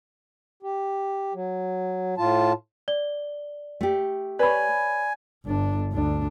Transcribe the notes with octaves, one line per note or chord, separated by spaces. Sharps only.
G4
F#3
A2 F4 A5
D5 G7
A3 G4
B4 C#5 D5 G#5 B5
G1 D4
D2 D4